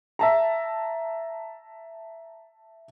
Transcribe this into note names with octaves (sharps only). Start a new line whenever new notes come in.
E5 A5 A#5